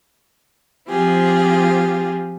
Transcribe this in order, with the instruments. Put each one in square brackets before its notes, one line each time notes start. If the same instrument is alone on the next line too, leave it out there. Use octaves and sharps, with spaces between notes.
[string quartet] F3 C4 F4 G4 G#4